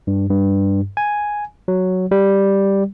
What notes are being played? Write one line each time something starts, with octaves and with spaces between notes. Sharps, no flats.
G2
G2
G#5
F#3
G3